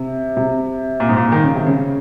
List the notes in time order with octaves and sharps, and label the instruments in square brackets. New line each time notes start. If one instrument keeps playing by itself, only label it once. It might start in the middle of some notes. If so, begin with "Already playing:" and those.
Already playing: [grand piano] C3
C3
A#2
G#2
A#2
D#3
C#3
C3
C#3